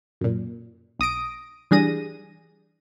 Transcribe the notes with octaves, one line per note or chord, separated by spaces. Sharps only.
F#2 A#2
B1 D#6 A#6 D7
E3 G3 D4 G#4 A#6 D#7